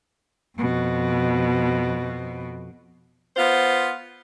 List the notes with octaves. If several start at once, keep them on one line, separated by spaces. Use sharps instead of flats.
F2 B2
B3 F4 C5